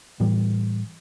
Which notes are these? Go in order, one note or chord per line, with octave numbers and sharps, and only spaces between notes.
A2 E3 G3